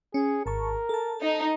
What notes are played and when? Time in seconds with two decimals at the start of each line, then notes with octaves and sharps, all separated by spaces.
0.14 C#4 G#4
0.46 G#1 A#4 A5 C#6
0.89 A4 A5
1.22 D#4